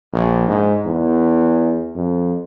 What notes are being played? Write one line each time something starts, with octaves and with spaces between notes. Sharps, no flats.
A#1
G#2
E2
F2